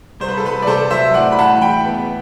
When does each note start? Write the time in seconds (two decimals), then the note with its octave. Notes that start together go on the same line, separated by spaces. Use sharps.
0.20 C2 C5
0.28 B4
0.37 A4
0.44 C2 B4
0.62 D5
0.67 C3 A4 C5
0.90 F#3 C5 E5
1.14 A2 D5 F#5
1.32 B5
1.38 A2 F#5 A5
1.61 E3 G5 B5
1.85 B3